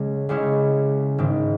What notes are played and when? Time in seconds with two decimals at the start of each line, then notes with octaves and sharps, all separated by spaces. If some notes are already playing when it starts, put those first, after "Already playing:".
Already playing: C#2 C#3 G#3 C#4
0.29 C#2 C#3 G#3 C#4 E4
1.18 G#1 G#2 D#3